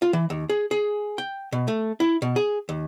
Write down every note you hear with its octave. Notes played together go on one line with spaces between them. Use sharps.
F4
E3
D#2
G#4
G#4
G5
B2
A3
E4
B2
G#4
D#2